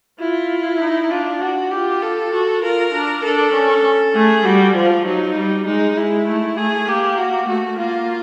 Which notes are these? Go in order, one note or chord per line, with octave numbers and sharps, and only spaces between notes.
E4 F4
D#4
D4 F4
F#4
F4 G4
A4
F#4
F4 A#4
D4
D4 A4
C#4
A3 G#4
G3 F#4
F3 F4
F#3 D#4
G3
G#3 D#4
G#3 E4
A3
A3 G#4
A#3 G4
F#4
A3 F#4
A#3 F4